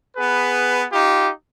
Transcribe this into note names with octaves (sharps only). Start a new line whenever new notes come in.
B3 G#4 B4
D#4 F4 G4